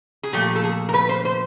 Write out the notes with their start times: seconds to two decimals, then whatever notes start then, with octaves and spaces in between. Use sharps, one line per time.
0.23 G#4
0.33 A#2 F3 A3 G4
0.56 A4
0.64 G#4
0.89 A#4
0.94 B4
1.09 C5
1.25 C5